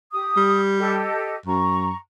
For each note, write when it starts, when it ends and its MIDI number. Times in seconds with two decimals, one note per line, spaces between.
0.12 0.57 67
0.12 0.57 87
0.37 1.07 55
0.78 1.35 67
0.78 1.35 69
0.78 1.35 75
1.46 1.92 42
1.46 1.96 82
1.46 1.96 85